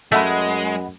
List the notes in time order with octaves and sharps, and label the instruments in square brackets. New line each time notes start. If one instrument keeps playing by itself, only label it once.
[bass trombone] F#2 [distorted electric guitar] G#3 [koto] A3 [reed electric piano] D#5 F#5 B5